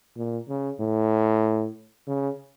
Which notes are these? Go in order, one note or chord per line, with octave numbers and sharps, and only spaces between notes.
A#2
C#3
A2
C#3